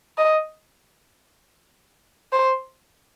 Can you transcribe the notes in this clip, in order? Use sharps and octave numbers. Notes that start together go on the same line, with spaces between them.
D#5
C5